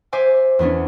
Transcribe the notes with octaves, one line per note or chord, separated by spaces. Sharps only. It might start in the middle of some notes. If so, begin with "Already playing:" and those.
C5 E5 G#5 D6
E2 B3 C#4 D4